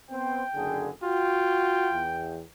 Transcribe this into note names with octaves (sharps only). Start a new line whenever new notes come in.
B3 C4 C5 G5
F#1 D3 G#4
F4 F#4 G5
E2